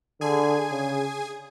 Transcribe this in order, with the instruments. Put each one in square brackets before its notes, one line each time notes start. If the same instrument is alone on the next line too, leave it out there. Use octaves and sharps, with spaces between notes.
[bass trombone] D3 [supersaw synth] G#4 G#5
[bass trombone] C#3